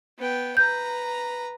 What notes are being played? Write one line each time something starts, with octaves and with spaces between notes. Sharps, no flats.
B3 G5
B4 A#5 G6